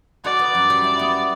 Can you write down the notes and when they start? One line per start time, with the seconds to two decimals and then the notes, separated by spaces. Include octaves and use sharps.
0.24 F#4 D5
0.39 B3
0.55 F#2
0.70 G3
0.84 E4
0.99 B3